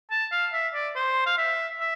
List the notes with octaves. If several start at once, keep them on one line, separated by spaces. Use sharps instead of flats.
A5
F5
E5
D5
C5
F5
E5
E5